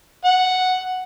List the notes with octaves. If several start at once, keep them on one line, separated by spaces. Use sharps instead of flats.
F#5